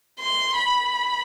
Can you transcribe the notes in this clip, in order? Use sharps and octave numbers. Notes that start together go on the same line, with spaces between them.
C6
B5